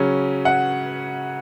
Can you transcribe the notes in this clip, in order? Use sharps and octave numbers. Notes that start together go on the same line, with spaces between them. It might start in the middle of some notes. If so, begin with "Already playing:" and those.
Already playing: C#3 F#3 C#4
F#5